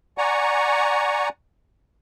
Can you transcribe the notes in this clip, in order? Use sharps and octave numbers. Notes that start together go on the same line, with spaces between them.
D5 F#5 G#5 A#5 C#6